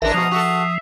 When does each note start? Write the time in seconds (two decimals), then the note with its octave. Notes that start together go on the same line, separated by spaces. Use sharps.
0.02 A1 E3 G#3 D4 A#4 E5 A#5
0.14 G#2 B2 F3 F#4 D#6
0.32 F#4 A4 E5